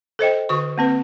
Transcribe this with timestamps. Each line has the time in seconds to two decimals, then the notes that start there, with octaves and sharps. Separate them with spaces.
0.19 A4 C5 D#5 G5
0.49 D3 F#4 C#6
0.78 A#3 C4 B4